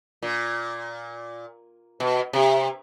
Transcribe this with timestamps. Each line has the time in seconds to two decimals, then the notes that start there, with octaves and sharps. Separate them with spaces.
0.23 A#2
2.00 B2
2.33 C3